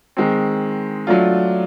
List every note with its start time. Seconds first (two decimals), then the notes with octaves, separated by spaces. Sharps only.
0.17 D#3 G#3 C4
1.07 F#3 A3 D4 F4